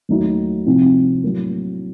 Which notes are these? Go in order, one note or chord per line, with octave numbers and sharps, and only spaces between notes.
D#2 D#3 F#3 A3 D#4
C2 C3 F3 C4 D#4
A2 F#3 A#3